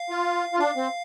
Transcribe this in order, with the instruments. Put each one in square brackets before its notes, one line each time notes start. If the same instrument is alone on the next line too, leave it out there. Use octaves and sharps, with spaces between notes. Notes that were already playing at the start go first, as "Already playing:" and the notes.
Already playing: [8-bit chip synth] F5
[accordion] F4
F4
[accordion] D4 [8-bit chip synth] F5
[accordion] C4